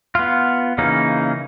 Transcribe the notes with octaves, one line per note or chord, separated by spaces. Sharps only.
B3 F4
C#3 E3 A#3 C#4 D#4